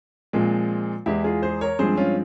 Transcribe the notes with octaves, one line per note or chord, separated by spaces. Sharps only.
A#2 F3 G#3 C4
E2 E3 G#3 E4 G4
F4 G#4
G#4 C5
A#4 C#5
G2 F3 G#3 C4 G#4 C5
C#4 F4